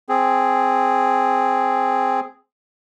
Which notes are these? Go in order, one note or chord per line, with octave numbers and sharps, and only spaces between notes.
C4 G#4